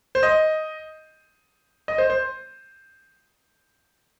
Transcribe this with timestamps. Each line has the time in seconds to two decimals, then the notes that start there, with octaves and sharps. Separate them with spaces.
0.15 C5
0.23 D#5
1.88 D#5
1.98 C5
2.10 C5